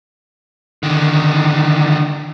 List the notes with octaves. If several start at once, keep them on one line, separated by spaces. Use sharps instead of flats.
D3 D#3